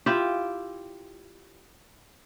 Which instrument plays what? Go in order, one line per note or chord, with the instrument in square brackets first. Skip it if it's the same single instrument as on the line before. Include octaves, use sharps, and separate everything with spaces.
[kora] E4 F4 G4